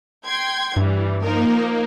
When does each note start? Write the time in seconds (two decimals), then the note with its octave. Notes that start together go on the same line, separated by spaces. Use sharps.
0.25 G5 C6 G#6
0.76 G2 E3 G3
1.23 F3 A#3 D#4 A#4